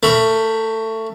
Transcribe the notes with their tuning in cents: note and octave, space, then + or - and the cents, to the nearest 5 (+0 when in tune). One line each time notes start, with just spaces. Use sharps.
A3 +20 A#4 +0 B5 +0